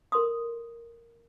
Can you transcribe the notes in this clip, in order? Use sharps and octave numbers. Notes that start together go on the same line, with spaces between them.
A4 A#4 C6 D#6